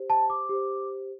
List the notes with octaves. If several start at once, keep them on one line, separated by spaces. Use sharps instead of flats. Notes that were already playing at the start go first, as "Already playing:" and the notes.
Already playing: G4 C5
A5
D6
G4 C5